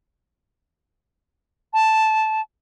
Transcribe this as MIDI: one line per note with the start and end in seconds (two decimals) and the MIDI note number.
1.74 2.41 81